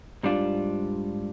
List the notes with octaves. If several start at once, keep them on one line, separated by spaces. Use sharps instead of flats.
G#2 G3 D4 F4